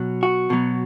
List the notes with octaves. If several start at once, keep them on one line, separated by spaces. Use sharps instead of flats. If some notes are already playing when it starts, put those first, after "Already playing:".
Already playing: B2 F#3
F#4
B2 F#3